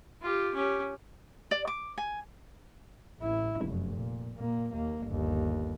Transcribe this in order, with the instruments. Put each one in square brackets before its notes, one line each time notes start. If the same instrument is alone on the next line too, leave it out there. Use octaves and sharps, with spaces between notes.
[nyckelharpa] F4 G4
C#4 G4
[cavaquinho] D5
D6
G#5
[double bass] A1 E4
F1 F#2
A#2
A#2 A#3
D#2 A#3
G1 D#2